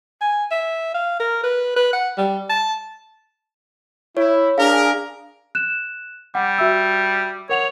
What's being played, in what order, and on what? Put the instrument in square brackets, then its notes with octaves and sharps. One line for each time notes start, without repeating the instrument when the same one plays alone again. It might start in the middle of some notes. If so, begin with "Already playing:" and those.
[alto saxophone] G#5
E5
F5
A#4
B4
B4
F#5
G3
A5
[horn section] E4 [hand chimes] C#5
[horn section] D4 G#4 A#4 [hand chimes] F5
[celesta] F#6 E7
[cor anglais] G3 [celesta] F#5
[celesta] F#4 E5 E6
[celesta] A#4 F#5 F7 [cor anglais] C#5